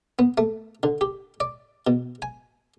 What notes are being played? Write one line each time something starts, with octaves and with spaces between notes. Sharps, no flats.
B3
A3
D3
G4
D5
B2
G#5